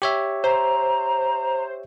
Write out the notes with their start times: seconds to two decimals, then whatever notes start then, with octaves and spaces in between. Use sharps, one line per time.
0.02 G4 C#5 E5
0.44 C5 A#5